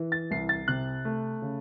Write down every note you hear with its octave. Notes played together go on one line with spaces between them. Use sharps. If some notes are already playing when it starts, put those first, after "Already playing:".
Already playing: E3
A6
C2 C7
A6
C3 F#6
A3
C#3